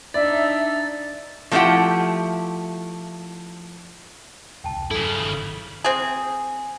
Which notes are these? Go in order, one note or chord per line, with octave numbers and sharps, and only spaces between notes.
D4 D#4 D5 E5 A6
F3 A3 C4 E4 G4 F#5
E1 C2 G5 A5
G2 C#3 F#3 E4 A4
G#1 D#3
C4 G#4